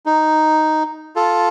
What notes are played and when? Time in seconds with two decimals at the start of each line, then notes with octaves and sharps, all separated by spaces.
0.06 D#4
1.16 F4 A4